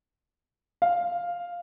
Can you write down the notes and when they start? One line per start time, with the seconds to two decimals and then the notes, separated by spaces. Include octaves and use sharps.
0.82 F5